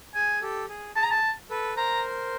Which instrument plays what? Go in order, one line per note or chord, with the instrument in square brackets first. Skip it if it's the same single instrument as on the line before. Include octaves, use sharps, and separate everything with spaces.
[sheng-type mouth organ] G#4 [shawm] G#5
[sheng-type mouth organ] G4 A4
G#4
[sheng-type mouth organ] G#4 [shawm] A5
[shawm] A#5
A5
[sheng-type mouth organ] A4 B4
[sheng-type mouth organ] A#4 C5 [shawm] A#5